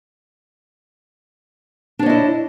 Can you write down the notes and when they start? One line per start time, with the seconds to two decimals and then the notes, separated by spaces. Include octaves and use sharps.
1.99 D4
2.03 C#5
2.06 D#5
2.09 E4